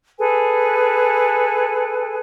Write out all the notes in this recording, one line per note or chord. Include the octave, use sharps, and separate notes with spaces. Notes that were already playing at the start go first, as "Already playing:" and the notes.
G#4 A4 B4 G#5